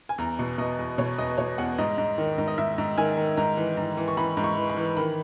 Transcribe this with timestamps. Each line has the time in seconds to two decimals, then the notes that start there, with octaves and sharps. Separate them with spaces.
0.09 G#5
0.18 E2 A#5
0.39 B2
0.58 B2 D#5
0.79 E2
0.98 B2 C#5
1.18 E2 D#5
1.38 B2 C#5
1.58 E2 F#5
1.78 G#2 D#5
1.98 G#2
2.18 D#3
2.38 G#2
2.48 D#5
2.58 G#2 E5
2.78 G#2
2.98 D#3 G#5
3.17 D#3
3.37 G#2 A#5
3.57 E3
3.77 G#2
3.97 E3
4.08 C#6
4.17 E3 B5
4.37 G#2
4.44 C#6
4.57 E3
4.70 B5
4.77 E3
4.97 D#3 B5